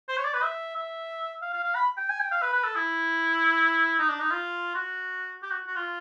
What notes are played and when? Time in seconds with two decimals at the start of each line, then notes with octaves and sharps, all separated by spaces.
0.09 C5
0.17 C#5
0.25 D5
0.34 B4
0.43 E5
0.76 E5
1.42 F5
1.54 F5
1.64 F5
1.75 B5
1.97 G5
2.09 G#5
2.20 G5
2.32 F5
2.42 B4
2.53 B4
2.64 A4
2.76 E4
3.99 D#4
4.09 D4
4.20 D#4
4.31 F4
4.75 F#4
5.43 G4
5.51 F#4
5.67 F#4
5.76 F4